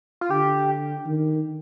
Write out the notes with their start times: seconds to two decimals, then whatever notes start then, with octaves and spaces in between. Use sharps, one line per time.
0.21 F4
0.30 D3 G4
1.06 D#3